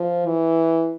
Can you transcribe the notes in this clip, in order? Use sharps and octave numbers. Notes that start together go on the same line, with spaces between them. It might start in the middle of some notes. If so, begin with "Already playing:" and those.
Already playing: F3
E3